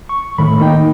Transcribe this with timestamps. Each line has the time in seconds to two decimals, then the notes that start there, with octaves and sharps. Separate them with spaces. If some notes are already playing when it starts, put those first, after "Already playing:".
0.09 C#6
0.38 A2 D#3 A3 B5
0.60 A#3 D#4 G5